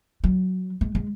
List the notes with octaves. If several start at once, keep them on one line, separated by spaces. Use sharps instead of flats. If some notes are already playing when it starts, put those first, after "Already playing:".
F#3
G#3
G#3